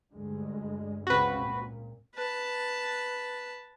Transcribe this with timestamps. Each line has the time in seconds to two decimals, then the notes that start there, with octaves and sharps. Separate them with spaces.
0.13 D2 G2 G#3
1.07 C#2 C#3 C4 F#4 B4
1.44 A#2
2.15 B4 A5